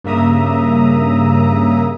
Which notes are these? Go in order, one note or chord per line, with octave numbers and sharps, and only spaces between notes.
G2 C#3 A#3 E5 A#5 D#6